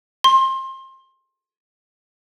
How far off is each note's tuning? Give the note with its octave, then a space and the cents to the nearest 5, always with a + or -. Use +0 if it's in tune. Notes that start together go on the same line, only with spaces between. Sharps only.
C6 +25